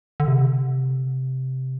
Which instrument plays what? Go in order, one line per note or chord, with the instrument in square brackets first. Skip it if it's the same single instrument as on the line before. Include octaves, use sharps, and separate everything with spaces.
[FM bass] D3
C3